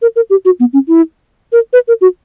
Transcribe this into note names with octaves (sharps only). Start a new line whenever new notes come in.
A#4
A#4
G4
F#4
B3
C#4
E4
A#4
B4
A#4
F#4